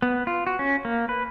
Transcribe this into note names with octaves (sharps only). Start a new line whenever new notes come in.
B3
F4
F#4
C#4
A#3
B4